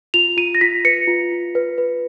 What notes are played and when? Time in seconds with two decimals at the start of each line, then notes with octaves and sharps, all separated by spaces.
0.14 F4 F7
0.37 F4 D#7
0.55 A#6
0.61 F4 B6
0.85 B4 C#7
1.08 F4
1.32 F4
1.55 B4
1.78 B4